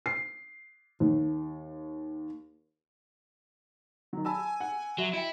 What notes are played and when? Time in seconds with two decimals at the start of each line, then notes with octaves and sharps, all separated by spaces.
0.06 C7
1.00 D#2
4.13 D#3 F#3
4.25 G#5 A5 B5 E6
4.60 F#5
4.98 F#3 F#4 E5
5.13 E4 D#5 E5 G5